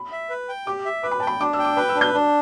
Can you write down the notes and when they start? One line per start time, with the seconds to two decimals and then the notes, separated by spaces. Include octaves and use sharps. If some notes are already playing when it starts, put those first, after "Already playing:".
Already playing: B5
0.12 E5
0.30 B4
0.49 G5
0.67 G4 D6
0.86 E5
1.03 B4 D6
1.11 B5
1.20 G5 A5
1.27 B5
1.40 D4 D6
1.53 E6
1.59 G5
1.65 D6
1.77 B4 B5
1.89 E6
1.95 D4
2.01 G6
2.14 D4